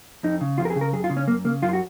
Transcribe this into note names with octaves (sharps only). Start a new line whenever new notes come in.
F2 D#4
C#3
F2 F4
A#4
G#4
C#3
A#4
F#2 G#4
F4
C#3
C#4
F#2 A#3
C#3 A#3
F#2 F4
F#4